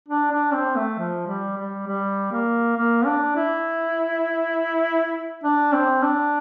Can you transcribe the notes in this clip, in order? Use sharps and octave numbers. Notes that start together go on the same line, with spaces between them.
D4
D4
C4
A3
F3
G3
G3
G3
A#3
A#3
D4
E4
D4
C4
D4